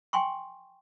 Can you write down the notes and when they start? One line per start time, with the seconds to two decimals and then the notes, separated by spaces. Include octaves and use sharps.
0.13 G5 G#5 C6 C#6